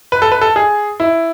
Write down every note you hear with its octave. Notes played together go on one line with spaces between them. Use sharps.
B4
A4
B4
A4
G#4
E4